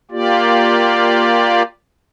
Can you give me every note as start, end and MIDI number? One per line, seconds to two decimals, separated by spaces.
0.11 1.62 58
0.11 1.62 65
0.11 1.62 67
0.11 1.62 74